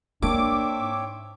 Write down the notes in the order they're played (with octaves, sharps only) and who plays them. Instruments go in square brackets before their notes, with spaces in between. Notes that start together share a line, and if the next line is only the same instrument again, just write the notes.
[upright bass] A#3 [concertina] C4 C#5 E5 [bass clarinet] D4 [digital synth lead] D6
[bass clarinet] G#2